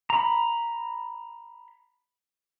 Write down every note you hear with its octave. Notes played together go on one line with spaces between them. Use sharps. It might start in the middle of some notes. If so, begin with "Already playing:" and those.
A#5 B5